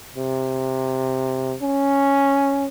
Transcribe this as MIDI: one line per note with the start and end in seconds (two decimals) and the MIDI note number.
0.17 1.54 48
1.62 2.66 61